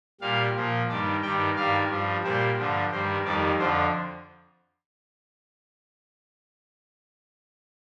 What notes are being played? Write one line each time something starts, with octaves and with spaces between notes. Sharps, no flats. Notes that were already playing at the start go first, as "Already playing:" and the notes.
A#2 G3 F5
A#2 F3
G2 D#3 G3 D5
G2 D#3 G3 G5
G2 D#3 G3 F5
G2 F3
A#2 G3 C5
G2 D3 F3
G2 D#3 G3 C5
F2 D#3 G3 D5
F2 D3 F3 C5